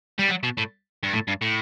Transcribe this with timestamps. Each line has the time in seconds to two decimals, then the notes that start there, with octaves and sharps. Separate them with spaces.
0.19 G3
0.29 F#3
0.43 B2
0.58 A2
1.03 G2
1.13 A2
1.28 G2
1.42 A2